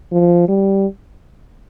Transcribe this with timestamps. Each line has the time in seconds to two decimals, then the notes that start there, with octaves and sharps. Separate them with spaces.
0.12 F3
0.48 G3